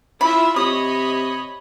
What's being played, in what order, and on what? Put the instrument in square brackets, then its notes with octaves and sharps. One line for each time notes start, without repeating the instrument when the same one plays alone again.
[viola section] E4 F4 E5 [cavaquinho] B5
[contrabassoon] C3 [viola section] C#5 D#5 B5 [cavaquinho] D#6